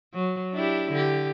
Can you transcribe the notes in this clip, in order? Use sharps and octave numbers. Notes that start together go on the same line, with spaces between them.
F#3
D4 E4 G4
D3 G4